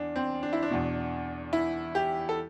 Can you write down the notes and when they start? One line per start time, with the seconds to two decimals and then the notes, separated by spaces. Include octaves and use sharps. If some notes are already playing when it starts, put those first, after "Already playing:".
Already playing: E2 D4
0.16 C4
0.43 D4
0.53 E4
0.63 D4
0.70 E2 B2
1.53 E4
1.95 G4
2.29 A4